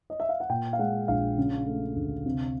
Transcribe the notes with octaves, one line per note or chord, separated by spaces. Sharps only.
D#5
E5
F5
F#5
A#2 G5
F5
G#3 F#5
A#1 F5
C#3
A3
D2
C3